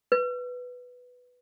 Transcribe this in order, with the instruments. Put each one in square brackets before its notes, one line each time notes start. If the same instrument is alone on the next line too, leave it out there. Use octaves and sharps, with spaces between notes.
[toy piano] B4